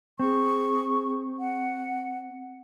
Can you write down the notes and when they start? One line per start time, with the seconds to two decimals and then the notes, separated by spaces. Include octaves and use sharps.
0.20 C4 G#4 C#6
1.40 F#5